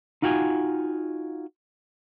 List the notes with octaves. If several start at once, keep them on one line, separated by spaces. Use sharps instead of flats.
D#4 F4 F#4 G5 G#5